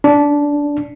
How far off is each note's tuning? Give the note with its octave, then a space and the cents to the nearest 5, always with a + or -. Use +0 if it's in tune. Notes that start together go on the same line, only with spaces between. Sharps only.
D4 -15